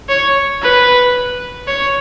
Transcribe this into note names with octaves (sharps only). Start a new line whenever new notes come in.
C#5
B4
C#5